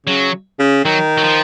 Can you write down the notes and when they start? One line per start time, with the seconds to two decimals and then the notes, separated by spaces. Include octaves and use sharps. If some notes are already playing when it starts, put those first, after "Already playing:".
0.06 C#3 F#3
0.59 C#3
0.84 D#3 F#3
1.18 F#3
1.24 F3